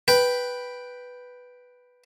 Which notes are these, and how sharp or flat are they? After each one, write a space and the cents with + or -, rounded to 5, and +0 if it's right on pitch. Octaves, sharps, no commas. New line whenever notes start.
B4 +0 G5 +0